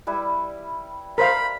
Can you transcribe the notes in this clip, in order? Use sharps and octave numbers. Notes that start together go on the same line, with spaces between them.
G3 E4 B4
A#4 C5 F5 B5